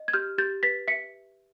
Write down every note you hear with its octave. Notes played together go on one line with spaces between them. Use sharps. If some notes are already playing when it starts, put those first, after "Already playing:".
Already playing: D#5
G#6
G4 F6 G6
G4 G6 A6
B4 A6 B6
E5 B6 C#7